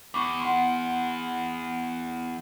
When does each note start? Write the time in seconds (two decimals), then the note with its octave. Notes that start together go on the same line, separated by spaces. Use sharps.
0.14 E2 C#6 D6
0.41 F#5 C6